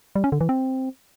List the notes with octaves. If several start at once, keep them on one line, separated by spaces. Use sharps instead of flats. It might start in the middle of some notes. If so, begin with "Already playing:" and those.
G3
C#4
D3
E3
C4